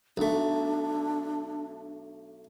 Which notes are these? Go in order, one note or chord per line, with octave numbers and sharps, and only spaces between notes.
B1 A3 D4